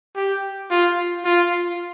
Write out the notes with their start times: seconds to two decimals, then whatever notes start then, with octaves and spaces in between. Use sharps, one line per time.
0.16 G4
0.70 F4
1.25 F4